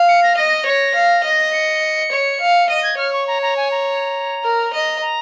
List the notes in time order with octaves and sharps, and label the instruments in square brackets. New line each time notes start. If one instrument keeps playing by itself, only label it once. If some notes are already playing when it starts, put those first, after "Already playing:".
Already playing: [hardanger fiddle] F5
[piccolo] C#7
A#6
[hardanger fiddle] D#5 [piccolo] A#6
[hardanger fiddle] C#5
F5
D#5
[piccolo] C#7
[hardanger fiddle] C#5
F5
[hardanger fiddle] D#5 [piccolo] D#7
[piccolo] G#6
[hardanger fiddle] C#5 [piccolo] F6
[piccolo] C#6
A#5
A#5
G#5
A#5
[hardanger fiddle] A#4
D#5
[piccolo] A#5